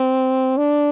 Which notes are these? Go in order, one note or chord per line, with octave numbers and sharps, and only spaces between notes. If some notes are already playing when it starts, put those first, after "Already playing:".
Already playing: C4
D4